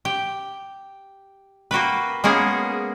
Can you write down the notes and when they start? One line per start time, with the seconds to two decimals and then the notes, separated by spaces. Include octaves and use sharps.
0.05 G4
1.71 A#3 F#4 G4 B4
2.24 G#3 A#3 B3 C#4 G#4